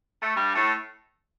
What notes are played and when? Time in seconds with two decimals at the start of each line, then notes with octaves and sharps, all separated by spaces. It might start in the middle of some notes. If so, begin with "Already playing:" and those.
0.23 A3
0.36 G2 G3
0.55 A2 A3